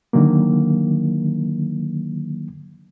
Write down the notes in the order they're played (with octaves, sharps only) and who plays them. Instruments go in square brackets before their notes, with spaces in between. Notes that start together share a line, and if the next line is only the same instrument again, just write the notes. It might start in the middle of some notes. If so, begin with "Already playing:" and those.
[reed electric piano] D3 D#3 F#3 A#3